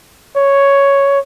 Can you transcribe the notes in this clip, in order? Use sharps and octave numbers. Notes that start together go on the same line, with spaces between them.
C#5